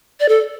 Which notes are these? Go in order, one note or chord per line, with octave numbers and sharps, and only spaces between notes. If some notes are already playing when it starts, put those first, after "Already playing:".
D5
A4